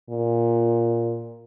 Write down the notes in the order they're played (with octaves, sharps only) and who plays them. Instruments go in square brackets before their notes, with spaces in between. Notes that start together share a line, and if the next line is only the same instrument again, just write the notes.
[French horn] A#2